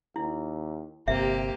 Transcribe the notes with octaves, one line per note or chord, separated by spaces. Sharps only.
D#2 E4
G1 C3 A#3 G4 E5